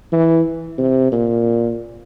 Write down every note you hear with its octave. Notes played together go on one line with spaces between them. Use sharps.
E3
C3
A#2